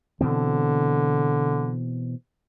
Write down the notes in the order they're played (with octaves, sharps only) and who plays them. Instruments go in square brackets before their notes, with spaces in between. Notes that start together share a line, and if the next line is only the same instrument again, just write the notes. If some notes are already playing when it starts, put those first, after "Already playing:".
[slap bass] B2 E3 C4 [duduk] D3